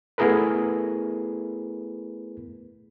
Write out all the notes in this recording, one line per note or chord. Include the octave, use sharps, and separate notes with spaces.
A3 B3 E4 G#4 A#4 B4